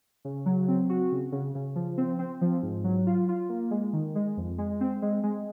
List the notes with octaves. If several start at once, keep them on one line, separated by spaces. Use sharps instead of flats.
C#3
F#3
C4
F#4
C#3
C#3
C#3
F3
C4
C4
F3
G#2
F#3
F4
F4
A#3
G#3
D#3
G#3
F2
G#3
C4
G#3
G#3